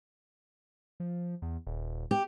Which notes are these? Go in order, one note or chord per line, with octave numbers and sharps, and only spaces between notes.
F3
E2
D#1
G4